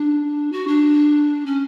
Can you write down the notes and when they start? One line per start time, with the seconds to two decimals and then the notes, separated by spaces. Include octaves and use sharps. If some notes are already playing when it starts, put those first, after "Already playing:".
Already playing: D4
0.52 F#4
0.67 D4
1.46 C#4